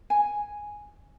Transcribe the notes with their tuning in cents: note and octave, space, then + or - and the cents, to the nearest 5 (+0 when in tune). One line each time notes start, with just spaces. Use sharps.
G#5 +0